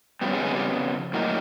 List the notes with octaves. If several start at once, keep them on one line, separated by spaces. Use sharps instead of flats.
F2 C#3 F#3 G3 B3 G4
G#3 G#4
G#3 G#4
G3 G4
A2 F#3 A#3 D#4